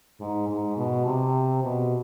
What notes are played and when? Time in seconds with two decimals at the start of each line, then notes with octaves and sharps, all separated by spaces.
0.20 G#2
0.49 G#2
0.77 B2
1.06 C3
1.63 B2